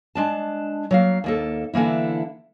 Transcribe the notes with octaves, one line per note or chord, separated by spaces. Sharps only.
G#3 D4 A5
F#3 A#3 F5
D#2 A#3 A4
D3 E3 A#3 E4